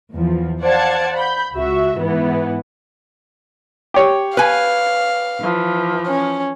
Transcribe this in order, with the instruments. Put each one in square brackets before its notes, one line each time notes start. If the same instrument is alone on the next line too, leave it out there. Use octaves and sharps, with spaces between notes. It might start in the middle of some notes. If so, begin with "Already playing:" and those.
[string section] E2 F3
C5 D5 F5 F#5 A5 G#6
B5 G6
C#2 F#4 E5
G#2 E3 B3
[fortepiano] G4 C#5
[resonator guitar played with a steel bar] B4 G#5 [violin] F5
[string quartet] E3 F3
[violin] C#4